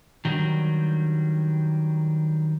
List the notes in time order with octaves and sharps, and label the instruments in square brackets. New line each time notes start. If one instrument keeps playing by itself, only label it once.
[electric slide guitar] D#3 F#3 G3 D4